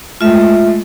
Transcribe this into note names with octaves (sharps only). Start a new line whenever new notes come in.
G#3 A3 F4 E5